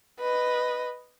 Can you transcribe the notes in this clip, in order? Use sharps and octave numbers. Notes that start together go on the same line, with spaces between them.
B4 D#5